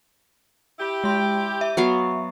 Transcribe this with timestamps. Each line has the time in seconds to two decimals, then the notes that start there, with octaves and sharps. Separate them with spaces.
0.79 E4 G4
1.04 G#3 C6
1.61 E5
1.77 F#3 B3 F5